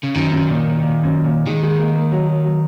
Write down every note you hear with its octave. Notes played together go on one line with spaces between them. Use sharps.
C#3
F#2 D#3
F#2
A#2
A#2
A#2
F#2
A#2
D#3 G#3
G#3
A#3
A#3
F#3
F#3
F#3